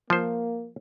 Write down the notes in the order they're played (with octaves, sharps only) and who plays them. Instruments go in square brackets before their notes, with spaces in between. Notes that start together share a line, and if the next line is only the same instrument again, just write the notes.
[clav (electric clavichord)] F3 C5 [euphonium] A#3